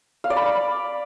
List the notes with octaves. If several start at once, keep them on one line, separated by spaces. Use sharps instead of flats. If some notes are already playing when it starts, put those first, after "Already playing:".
F5
D5
B5